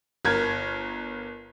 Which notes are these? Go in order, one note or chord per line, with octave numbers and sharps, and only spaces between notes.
G1 A#4 G#6